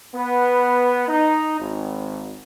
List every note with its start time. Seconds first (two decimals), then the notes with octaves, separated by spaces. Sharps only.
0.13 B3
1.08 D#4
1.59 G#1